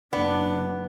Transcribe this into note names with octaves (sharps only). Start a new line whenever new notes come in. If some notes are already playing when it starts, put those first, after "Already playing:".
F#1 B3 D4 D5